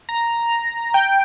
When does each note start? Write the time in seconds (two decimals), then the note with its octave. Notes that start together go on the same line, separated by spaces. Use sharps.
0.09 A#5
0.94 G5